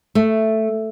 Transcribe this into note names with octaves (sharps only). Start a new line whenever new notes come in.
A3